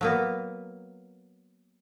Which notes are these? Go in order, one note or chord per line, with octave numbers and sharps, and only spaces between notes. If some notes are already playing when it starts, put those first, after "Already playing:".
F#3 A#3 B3